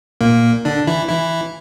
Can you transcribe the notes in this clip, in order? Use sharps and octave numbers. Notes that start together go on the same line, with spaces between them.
A#2 A#3
D3 D4
E3 E4
E3 E4